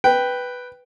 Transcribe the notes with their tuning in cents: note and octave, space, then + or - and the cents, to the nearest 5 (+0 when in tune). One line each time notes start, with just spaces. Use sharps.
B4 +0 G5 +0